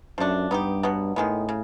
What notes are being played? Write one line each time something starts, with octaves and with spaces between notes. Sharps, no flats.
F#2 F3 A3 D4
G2 B3 D#4 G4
B2 F#3 B3
A2 D#3 G#3 B3
C#3